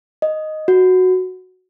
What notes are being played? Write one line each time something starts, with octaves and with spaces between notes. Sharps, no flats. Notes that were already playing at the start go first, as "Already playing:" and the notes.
D#5
F#4